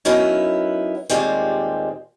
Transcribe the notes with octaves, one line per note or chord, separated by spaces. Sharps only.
F#3 B3 C#4 D#4 E4 A#4
D#2 A#2 G3 G#3 C4